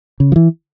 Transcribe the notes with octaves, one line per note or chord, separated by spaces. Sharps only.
C#3
F3
E3